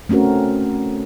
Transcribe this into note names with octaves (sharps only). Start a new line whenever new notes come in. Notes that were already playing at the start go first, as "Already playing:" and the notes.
A3 C4 C#4 F#4 A#4